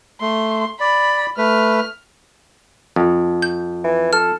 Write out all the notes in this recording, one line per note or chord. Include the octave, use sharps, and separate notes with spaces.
A3 C6
D5 B5
A3 B4 F6
F2
G6
E3
A4 F6